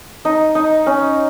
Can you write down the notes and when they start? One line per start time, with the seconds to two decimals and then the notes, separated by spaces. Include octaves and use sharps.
0.25 D#4
0.55 D#4
0.86 C#4